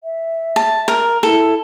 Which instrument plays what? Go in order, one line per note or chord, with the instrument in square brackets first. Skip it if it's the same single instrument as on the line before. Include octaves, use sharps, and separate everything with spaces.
[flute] E5
[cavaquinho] A5
A#4
[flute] E4 [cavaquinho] A4